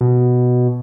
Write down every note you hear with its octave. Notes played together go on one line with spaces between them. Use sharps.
B2